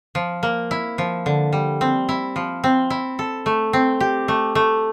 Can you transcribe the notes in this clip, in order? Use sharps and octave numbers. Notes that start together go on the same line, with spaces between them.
F3
A#3
E4
F3
D3
G3
C4
E4
F3
C4
E4
A4
A3
C4
G4
A3
A3